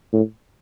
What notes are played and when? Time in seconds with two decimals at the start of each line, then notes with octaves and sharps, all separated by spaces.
0.13 A2